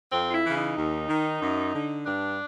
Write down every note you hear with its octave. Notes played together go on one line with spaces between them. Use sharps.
F2 C4
F4
E4
C#3 E3
D#4
D#2
D#3
F#2
D3
G2 D4